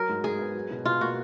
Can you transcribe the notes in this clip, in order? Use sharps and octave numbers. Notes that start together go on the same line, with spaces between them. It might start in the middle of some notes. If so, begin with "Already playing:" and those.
Already playing: F#3 A#4
G#2
G#2 G#4
B3
F#3
B2
B2 F4
A#3 F#4